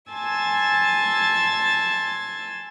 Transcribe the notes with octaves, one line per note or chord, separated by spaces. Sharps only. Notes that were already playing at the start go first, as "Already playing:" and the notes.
G#5 A5 C6 E6 G#6 A6